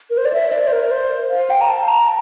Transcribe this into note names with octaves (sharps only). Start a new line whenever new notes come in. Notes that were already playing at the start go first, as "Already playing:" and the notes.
A#4
C5
D5
E5
D5
C5
A#4
C5
F5
G5
A#5
A5
A#5